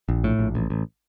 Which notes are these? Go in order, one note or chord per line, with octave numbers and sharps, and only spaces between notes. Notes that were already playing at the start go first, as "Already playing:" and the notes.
A#1
A2
A#1
A1
A1